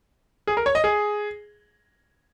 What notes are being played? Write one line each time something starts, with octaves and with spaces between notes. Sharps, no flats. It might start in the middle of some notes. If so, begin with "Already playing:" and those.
G#4
A#4
C#5
D#5
G#4